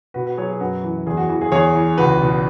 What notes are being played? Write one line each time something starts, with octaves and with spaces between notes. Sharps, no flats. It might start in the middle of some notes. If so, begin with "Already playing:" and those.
B2 F#4 B4
F#4 B4
F#3 G#4 C#5
G#4
F#2 F#4 B4
E3
E2 G#4
F#4
E3 F#4
G#4
E2 G#4 C#5
E3
C#2 F#4 B4
B2